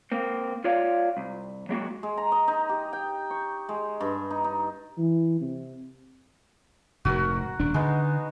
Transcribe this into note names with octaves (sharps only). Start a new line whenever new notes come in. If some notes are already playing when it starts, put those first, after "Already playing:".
A#3 C4
F4 C#5 D5 F5
C2
F#3 G#3 A#3 F#4
G#3
A#5
D#5
D#4
G4
G5
C#6
G#3
G2
D#4
D#4
E3
C3
F1 G#2 F#4 A#4
D#1 D4
D3 G#3 B3 D#4